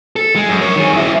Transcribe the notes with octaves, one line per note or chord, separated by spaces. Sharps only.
A4
G#3
F#2
A#4 C#5
D#3 G#4
F#2 E4